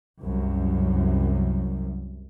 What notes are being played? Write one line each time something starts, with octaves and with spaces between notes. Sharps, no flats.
C2 F#2